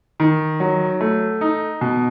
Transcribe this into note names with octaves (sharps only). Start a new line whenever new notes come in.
D#3
F#3
A3
D#4
B2